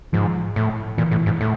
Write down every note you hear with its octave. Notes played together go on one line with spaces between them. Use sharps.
G#2 F3
A2
A#2 E3
A2
G#2
A2